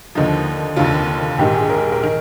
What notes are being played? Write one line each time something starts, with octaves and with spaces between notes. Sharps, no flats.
D#2 D3 F3 D#4
F1 D#2 D3 F4
A#1 G#2 D#3 G4
G#4
A#4
A#4
D#3